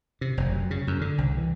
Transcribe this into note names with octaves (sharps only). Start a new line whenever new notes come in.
C3
F1
F#2
C#3
F#2
D3
C2
E3